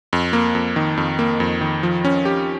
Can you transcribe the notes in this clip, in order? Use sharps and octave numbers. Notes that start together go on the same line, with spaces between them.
F2
A#3
F2
D#3
F2
A#3
F2
D#3
F3
C#4
G4